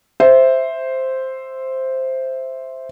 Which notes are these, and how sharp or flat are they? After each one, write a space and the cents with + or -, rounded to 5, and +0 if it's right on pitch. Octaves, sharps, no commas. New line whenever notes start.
C5 +0 E5 +0